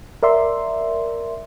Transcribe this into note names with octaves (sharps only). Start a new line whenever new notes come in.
A#4 D5 E5 C6